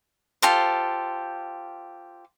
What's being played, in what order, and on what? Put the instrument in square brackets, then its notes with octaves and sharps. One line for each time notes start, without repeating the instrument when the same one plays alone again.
[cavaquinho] F4 G4 A4 C5